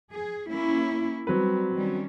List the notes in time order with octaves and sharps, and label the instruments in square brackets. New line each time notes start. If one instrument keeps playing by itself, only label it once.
[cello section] G#4
A#3 C#4 E4
[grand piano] F#3 C4 B4 [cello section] G3
[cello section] D#3 G3 C#4